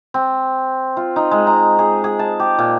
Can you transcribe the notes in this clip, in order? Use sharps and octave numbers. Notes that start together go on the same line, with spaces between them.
C4
F4
D#4
G#3
A#5
G#4
G#4
A5
G4
A#2